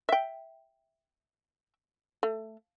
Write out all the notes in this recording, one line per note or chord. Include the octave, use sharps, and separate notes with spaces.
E5 G5
A3